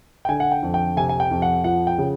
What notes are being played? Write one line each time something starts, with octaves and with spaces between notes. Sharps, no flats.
G5
D3 G#5
F#5
G5
F2
G5
C3 G#5
G#5
G5
F2
F#5
F3 F#5
G5
C#3